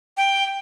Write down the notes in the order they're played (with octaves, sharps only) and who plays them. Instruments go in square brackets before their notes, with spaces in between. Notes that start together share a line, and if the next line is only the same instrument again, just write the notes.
[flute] G5